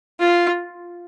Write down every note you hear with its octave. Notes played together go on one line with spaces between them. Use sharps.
F4